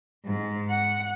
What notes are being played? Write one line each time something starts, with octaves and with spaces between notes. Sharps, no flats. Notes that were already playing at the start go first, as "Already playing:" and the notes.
G#2
F#5